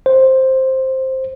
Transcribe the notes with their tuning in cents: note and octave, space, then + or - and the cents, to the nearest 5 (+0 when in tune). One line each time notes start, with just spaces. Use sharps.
C5 +10